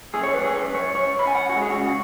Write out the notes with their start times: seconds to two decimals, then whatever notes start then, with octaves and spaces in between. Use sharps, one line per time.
0.14 F#2 G#4
0.23 C#5
0.34 F#2 B4
0.44 G#4
0.54 F#2 B4
0.74 F#2 C#5
0.95 F#2 C#5
1.15 F#2 B5
1.27 G#5
1.35 F#2 F#5
1.49 F#4
1.56 G#3
1.62 G#4
1.70 F#4
1.76 C#3
1.87 F#4